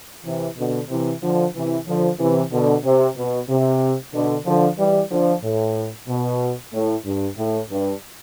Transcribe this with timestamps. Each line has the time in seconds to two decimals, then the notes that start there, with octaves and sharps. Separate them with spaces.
0.25 C3 E3
0.57 B2 D3
0.90 C3 E3
1.22 D3 F3
1.54 C3 E3
1.86 D3 F3
2.19 C3 E3
2.51 B2 D3
2.84 C3
3.16 B2
3.48 C3
4.13 B2 D3
4.45 D3 F3
4.78 E3 G3
5.10 D3 F3
5.43 A2
6.08 B2
6.72 A2
7.05 G2
7.37 A2
7.70 G2